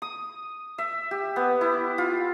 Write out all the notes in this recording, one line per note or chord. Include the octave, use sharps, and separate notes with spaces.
D#6
E5
G4
B3
E4
F4